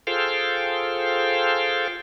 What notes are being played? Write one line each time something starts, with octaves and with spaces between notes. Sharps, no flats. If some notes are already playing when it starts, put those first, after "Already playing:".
F4 G#4 A4 C5 F5 G5